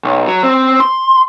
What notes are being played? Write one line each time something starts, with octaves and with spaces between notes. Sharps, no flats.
B1
F#3
C4
C6